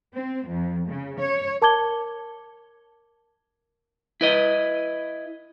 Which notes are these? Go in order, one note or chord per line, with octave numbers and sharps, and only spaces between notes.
C4
F2
C#3
C#5
A#4 A5 D6 G#6 G7
E4 B4 D#5